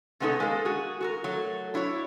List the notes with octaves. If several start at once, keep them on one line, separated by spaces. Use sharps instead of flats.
C3 G#3 B3 C#4 D#4 A4
G#3 A#3 A4
F#4 G#4
F#4 A4 A#4
F#3 A3
D4 E4 F#4 B4 C#5